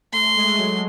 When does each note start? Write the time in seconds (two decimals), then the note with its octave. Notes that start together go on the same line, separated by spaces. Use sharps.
0.13 A3 C6
0.36 G#3
0.43 A3
0.51 G#3
0.58 F#3
0.72 G#3